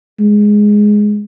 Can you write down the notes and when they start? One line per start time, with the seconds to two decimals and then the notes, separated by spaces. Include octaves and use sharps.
0.20 G#3